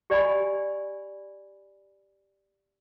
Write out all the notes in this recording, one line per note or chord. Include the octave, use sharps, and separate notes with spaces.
G4 D5 D#5 G#5 B5